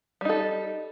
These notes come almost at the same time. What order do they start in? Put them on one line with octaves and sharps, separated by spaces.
G3 D#4 A4